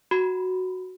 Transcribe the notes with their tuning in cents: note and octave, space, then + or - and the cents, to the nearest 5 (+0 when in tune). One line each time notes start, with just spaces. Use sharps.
F#4 +0 B5 +30